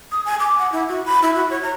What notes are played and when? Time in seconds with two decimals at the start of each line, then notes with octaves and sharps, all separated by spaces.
0.12 D#6
0.25 G#5
0.40 D6
0.58 F#5
0.72 E4
0.89 F#4
1.06 B5
1.22 E4
1.35 F#4
1.50 C#5
1.63 A#5